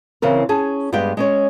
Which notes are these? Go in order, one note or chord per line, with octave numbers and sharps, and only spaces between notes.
C#3 E3 C4 A#4
C#4 G#4 A5
G2 G#3 B3 G4 G5
G#3 C#4 C#5